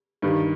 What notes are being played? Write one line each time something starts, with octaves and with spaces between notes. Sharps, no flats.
G2 D#3